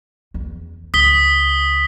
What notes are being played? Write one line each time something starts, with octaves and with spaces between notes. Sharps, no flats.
E2
C#2 D#6 B6 G7